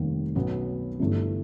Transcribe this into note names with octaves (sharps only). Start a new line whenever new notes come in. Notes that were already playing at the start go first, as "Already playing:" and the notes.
Already playing: F1 D#2 D#3 G3
B1 B2 F#3 B3
G1 G2 E3 A3